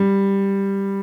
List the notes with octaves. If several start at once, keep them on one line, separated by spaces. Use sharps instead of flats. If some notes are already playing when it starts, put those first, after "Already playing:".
Already playing: G3